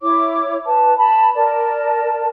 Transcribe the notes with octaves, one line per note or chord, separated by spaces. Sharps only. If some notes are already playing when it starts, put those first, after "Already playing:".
E4 C#5 D6
B4 A5
A5 B5
A#4 D5 A5